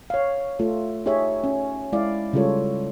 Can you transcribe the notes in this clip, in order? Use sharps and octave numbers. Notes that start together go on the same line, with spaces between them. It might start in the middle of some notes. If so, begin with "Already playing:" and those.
C#5 F5
A3 F4 A4
D#4 G4 G#4 C#5 E5
C#4
G#3 E4 D5 F5
C#3 G3 G#3 F4 A4 C#5